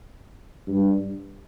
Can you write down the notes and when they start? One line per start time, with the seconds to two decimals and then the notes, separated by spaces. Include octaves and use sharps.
0.67 G2